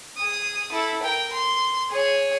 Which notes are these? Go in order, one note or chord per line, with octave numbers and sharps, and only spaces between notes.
G#4 D#6
E4 A4
A#4 G5
C6
G#4 C#5